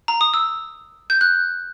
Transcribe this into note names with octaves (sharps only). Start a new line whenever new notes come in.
A#5
D#6
E6
G6
F#6